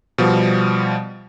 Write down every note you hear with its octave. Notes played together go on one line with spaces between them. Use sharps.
B2 F3 G3